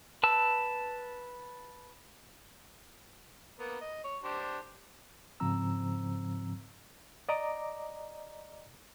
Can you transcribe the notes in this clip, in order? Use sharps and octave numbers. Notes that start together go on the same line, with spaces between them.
B4 A5 E6
A#3 B3
D#5
C#5
D4 G4 C5
G#2 C#3 F3 C4 A#5 E6
D5 D#5 A#5 D6